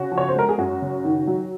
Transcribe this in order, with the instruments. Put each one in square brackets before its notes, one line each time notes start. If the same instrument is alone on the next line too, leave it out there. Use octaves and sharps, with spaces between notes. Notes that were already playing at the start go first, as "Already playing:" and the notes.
Already playing: [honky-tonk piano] C#3 F#4
F3
C#5
C5
G#3 A#4
G#4
F#2 F#4
C#3
D#3
F#3